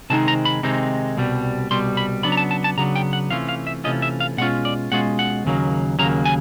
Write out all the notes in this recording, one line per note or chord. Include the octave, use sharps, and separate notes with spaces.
C3 D#3 G#3 C4 D#4 A5
A#5
B5
C3 D#3 G#3 C4 D#4
C2 B2 G3
C2 B2 G3 C6
B5
C#3 F#3 B3 D4 B5
A#5
A5
A5
A5
C#3 F#3 B3 D4 A#5
G5
F#5
C3 E3 A3 C#4 F4 F5
F5
E5
C3 E3 A3 C#4 F4 D#5
E5
F5
B2 G#3 C#4 F4 F#5
D5
B2 G#3 C#4 F4 F#5
F#5
D#2 C#3 F#3 A#3
D#2 C#3 F#3 A#3 A#5
G#5